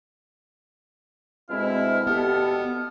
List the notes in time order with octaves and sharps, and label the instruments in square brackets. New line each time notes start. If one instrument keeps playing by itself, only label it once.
[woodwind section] D2 B2 F6 [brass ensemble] G#3 C4 E4
[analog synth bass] B3 [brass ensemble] G4 A4